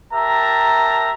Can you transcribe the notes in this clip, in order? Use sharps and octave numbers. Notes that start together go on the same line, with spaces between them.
G4 A#4 E5 A5 A#5